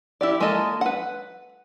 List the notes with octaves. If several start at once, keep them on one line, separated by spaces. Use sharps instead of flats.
E4 G4 D5
G#3 A#3 F4 A4 D#5
B4 F#5